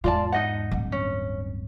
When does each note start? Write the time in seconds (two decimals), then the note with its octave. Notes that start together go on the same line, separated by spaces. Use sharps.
0.04 E2 G#2 F4 D5 A5
0.32 D#4 D#5 F#5
0.71 D1 G2
0.92 C#4